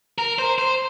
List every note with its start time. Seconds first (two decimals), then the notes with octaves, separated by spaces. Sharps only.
0.18 A#4
0.39 C5
0.58 C5